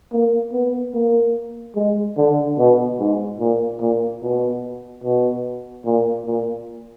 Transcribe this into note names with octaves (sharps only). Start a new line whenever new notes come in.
A#3
B3
A#3
G#3
D3
B2
G#2
A#2
A#2
B2
B2
A#2
A#2